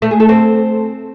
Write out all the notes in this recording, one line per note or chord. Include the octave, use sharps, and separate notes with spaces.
A3
G#4
A4
C4